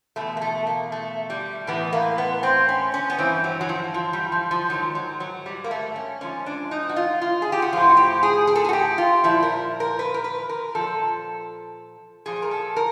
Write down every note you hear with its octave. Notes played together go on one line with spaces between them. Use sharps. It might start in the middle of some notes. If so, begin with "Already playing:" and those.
E2 B2 A3
A#3
A3
A#3
A3
G3
A2 E3 B3
A#3
B3
C4
C#4
C#4
B3
G2 E3 C4
F#3
F#3
F3
F3
G3
F3
F3
G#2 D#3 F#3
F#3
F#3
G3
A#3
A3
C#4
G#2 F3 C#4
D4
D#4
F#4
F4
F4
G#4
G4
F#4
A2 F3 F4
F#4
G4
G#4
G#4
A4
G#4
F#4
G4
F4
A#2 F3 E4
A#4
A#4
B4
A#4
B4
A#4
A#2 F3 A4
A#2 F3 G#4
A#4
A4
A#4